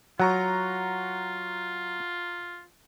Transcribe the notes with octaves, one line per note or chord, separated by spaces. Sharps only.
F#3 F4 F#5 A#5 C#6